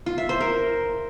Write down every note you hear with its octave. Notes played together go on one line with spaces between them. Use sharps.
F4
E5
C5
A#4